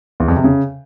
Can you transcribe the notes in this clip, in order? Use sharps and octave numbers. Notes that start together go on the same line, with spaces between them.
E2
F2
C3
C#3